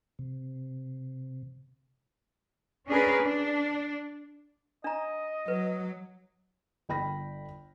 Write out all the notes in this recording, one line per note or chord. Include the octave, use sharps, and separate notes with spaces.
C3
C#4 D4 G#4 A#4 B4
D4
D4 D#5 A#5
F#3 B4
G1 G5 B5 A#6